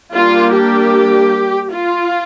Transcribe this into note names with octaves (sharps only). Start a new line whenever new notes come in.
G3 A#3 D4 F4
G4
F4